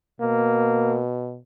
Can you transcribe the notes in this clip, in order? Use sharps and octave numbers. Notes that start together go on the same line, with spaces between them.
B2 A#3